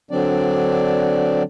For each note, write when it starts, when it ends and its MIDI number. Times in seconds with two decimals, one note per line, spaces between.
0.11 1.43 50
0.11 1.43 54
0.11 1.43 60
0.11 1.43 62
0.11 1.43 74